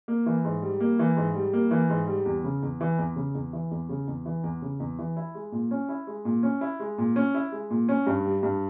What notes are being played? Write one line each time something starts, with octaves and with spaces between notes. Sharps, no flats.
A#3
E3
G#2
G3
A#3
E3
G#2
G3
A#3
E3
G#2
G3
E2
C#3
E2
E3
E2
C#3
E2
E3
E2
C#3
E2
E3
E2
C#3
E2
E3
E4
G#3
A#2
C#4
E4
G#3
A#2
C#4
E4
G#3
A#2
C#4
E4
G#3
A#2
C#4
G2
G3
G2